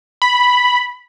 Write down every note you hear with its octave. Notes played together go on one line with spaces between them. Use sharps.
B5